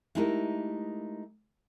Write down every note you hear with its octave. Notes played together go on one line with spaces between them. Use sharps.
G#3 A3 D#4 E4 G4 A#4